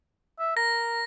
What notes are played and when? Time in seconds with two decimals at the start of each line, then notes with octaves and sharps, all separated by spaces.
0.39 E5
0.57 A#4 A#6